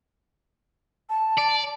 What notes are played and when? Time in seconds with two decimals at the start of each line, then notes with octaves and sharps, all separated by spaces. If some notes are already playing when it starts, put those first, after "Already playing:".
1.10 A5
1.38 D5